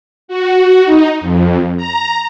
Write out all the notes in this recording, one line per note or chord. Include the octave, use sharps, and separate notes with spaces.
F#4
D#4
F2
A#5